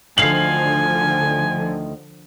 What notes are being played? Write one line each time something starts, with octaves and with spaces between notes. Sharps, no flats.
D2 D3 D#3 F3 F5 G#5 C7 F#7